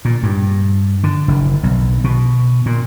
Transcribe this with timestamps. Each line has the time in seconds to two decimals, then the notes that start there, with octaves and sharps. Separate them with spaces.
0.05 A#2
0.23 G2
1.03 D3
1.28 F#1
1.63 B1
2.04 B2
2.66 A#2